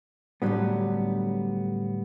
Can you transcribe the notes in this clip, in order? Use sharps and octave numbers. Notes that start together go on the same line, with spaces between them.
A2 D3 E3 F#3 G3 B3